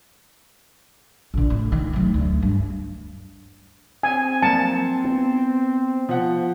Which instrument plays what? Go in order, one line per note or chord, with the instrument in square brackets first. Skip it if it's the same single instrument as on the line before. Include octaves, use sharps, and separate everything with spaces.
[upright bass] A#1 D3
A2
D#3
F#3 A3
D2
G2
[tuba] C4 [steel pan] G#5
[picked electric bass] F3 F#3 A#3 [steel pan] A5 [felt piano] C#7
[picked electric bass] B3
[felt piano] F3 F#5